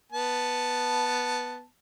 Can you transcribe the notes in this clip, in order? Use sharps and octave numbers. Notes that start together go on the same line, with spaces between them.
B3 A5